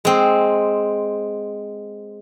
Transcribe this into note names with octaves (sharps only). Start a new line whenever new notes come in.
G#3 C4